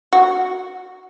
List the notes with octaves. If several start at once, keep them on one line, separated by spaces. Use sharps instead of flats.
F#4